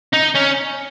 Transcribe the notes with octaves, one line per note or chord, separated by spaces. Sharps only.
D#4
C#4